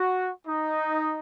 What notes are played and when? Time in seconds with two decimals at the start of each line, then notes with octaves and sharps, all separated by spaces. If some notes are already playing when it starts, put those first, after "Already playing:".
Already playing: F#4
0.47 D#4